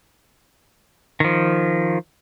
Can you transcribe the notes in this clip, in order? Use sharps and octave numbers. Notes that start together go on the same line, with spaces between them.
D#3 F3